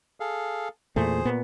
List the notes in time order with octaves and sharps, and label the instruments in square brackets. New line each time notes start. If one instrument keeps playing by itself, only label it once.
[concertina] G#4 A4 F5
[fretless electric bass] E2 A#2 A3 [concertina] G#4 C5
[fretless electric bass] A#2 B3